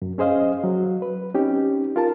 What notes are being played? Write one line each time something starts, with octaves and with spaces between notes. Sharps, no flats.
F#2
C#4 G#4 C5 D#5 F5
F#3
B4
C4 C#4 D#4 G4
F4 A#4 A5